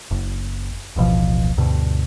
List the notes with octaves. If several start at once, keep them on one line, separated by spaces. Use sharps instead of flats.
F#1
D1 A1 B2 F3
D2 G2 B2 D3